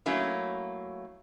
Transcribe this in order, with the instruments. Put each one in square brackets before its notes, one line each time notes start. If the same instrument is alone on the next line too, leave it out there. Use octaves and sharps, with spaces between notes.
[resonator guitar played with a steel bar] F#3 A3 A#3 C#4 E4